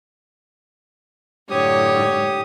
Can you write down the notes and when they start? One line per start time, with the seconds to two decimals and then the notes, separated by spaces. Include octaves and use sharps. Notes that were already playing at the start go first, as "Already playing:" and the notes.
1.50 F#2 A2 D3 G4 C#5 D#6